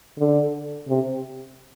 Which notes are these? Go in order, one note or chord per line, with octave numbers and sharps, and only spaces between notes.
D3
C3